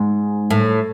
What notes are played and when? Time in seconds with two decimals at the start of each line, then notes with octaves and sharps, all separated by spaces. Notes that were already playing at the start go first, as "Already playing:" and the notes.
Already playing: G#2
0.50 A2